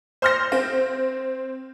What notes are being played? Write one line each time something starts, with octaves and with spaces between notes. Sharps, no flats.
C5 C6 F6 G6 A#6
C4